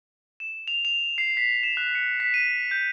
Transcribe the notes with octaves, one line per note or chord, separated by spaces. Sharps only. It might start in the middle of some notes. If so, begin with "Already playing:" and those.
E7
F7
F7
C7
B6
E7
F#6
C#7
B6
D#7
G6